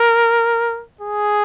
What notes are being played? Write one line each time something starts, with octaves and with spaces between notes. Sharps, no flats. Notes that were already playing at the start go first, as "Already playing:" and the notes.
Already playing: A#4
G#4